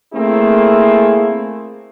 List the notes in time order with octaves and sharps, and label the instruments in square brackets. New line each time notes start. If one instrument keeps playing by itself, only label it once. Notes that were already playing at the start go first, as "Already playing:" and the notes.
[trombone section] A3 A#3 C4 E4 G#4